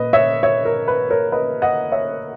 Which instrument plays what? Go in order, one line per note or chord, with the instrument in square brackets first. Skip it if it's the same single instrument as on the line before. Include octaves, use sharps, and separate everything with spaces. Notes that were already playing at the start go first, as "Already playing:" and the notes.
Already playing: [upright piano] A#2 B4 D#5
C#5 E5
C#5 E5
A#4
B4
A#4 C#5
B4 D#5
D#5 F#5
C#5 E5